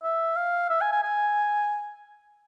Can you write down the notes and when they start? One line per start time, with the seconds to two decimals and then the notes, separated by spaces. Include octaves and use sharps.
0.03 E5
0.36 F5
0.70 E5
0.81 G#5
0.92 G#5
1.03 G#5